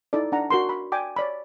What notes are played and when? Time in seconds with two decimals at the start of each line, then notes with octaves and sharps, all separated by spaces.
0.13 D#4 E4 A4 D5
0.32 D4 F#5 A#5
0.51 F#4 A#4 C6
0.69 B5
0.92 D5 G5 G#5 D6
1.16 C#5 D5 B5